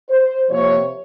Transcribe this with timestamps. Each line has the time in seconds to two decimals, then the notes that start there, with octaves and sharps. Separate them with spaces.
0.09 C5
0.50 C3 F3 A#3 C#5